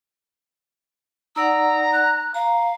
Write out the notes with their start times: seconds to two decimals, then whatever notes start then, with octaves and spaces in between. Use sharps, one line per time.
1.36 D#4 D5 F#5 A#5 E6
1.93 F#6
2.34 F5 A#5